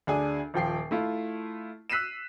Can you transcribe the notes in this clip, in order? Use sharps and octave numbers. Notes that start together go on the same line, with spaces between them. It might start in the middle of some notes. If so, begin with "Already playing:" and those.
D2 D4 G#4 G#5
D#1 F3 G5 C7
A3 E4 F4
E6 F#6 B6 C7 D#7 E7